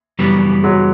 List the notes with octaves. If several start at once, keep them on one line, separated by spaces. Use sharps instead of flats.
F#2 C#3 E3 G3 B3
F#3 G#3